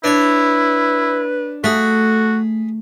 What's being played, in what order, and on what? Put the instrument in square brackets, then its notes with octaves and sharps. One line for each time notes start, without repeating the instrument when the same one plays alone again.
[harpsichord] D4 C#5 [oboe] E4 [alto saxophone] B4
[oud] A3 [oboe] F#4 [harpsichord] G#4 B5 [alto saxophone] A4